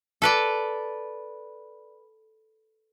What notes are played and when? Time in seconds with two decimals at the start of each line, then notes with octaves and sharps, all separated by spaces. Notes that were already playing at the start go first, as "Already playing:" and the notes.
0.22 A4 B4 D5